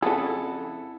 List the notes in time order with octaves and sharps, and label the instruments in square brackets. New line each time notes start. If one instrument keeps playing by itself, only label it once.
[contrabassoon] F2 [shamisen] C#3 G#4 [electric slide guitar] E4 F#5 [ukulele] A4